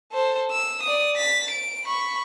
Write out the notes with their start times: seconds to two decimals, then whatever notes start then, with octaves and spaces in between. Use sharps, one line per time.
0.12 A4 C5
0.51 E6
0.83 D5 D#6
1.16 A6 B6
1.51 D7
1.86 B5 C#6